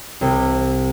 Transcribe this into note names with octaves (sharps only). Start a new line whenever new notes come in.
C2 C3